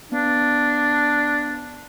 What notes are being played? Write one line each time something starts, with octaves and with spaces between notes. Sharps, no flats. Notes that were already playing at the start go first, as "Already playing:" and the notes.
B3 D4